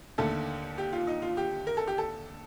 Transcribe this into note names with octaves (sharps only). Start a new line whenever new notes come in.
D#2 D3 A3 A4
G4
F4
D#4
F4
G4
A#4
A4
G4
A4